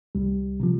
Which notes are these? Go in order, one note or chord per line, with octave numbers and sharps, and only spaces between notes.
C2 G3
C3 F3